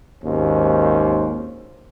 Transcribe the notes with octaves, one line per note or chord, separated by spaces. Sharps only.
G#1 D#2 C#4 C5